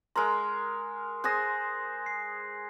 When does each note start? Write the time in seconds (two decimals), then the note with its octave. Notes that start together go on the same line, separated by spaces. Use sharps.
0.16 G#3 A#4 A#5 C6
1.24 G#4 C5 D#6 F#6 A#6
2.06 C7